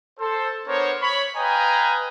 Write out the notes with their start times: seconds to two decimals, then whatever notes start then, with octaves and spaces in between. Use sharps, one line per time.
0.19 A4 C5
0.67 B3 D4 A#4 C5 C#5
1.01 C#5 B5
1.37 B4 D#5 F5 G5 G#5 A#5